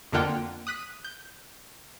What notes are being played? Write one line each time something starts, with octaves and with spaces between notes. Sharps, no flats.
F2 D3 A#3 F4 F#5 G5
D#6 F#6 B6 D#7
G6